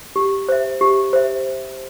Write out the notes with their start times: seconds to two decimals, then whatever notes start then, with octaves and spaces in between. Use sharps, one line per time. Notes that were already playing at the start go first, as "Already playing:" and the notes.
0.16 G4
0.49 C5 E5
0.81 G4
1.13 C5 E5